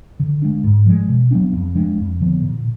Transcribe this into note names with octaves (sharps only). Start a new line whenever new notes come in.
D3
G#3 D4
G#2
F3 G#3
B2
F#3 B3 D4
F2
F3 G#3 D4
F2
D3 F3 B3
A#2